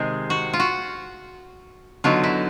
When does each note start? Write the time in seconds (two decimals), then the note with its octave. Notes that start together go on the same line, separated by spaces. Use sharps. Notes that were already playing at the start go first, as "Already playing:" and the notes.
Already playing: C3 D#3 G#3 C4 G#4
0.30 F#4
0.53 F4
0.60 F#4
2.04 D3 F#3 B3 D#4 F4
2.24 E4